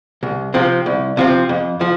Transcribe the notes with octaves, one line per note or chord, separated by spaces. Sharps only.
C2
C3 F3 C4
C2
C3 F3 C4
F2
F3